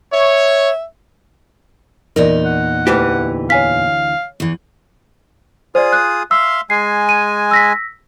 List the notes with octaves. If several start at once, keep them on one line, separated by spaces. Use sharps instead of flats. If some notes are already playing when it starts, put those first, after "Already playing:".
C#5 E5
E2 A#2 D#4 A#4 D5
F#5
D2 E3 G4
C#5 F5 G#5 B6
E2 E3
F4 G#4 C5 D5 D#6
F#6
E5 F5 C6 E6
G#3 G#5 C7
D#7
E6 A#6 B6